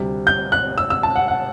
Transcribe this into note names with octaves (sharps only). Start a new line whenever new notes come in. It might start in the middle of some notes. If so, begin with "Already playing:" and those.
Already playing: D2 C3 G3
G6
F#6
E6
E6
A5
F#5
F#5